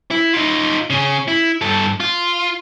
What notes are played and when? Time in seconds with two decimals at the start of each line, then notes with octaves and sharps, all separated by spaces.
0.11 E4
0.33 D#4 F4
0.90 C#3 C#4
1.28 E4
1.62 G2 A4
2.00 F4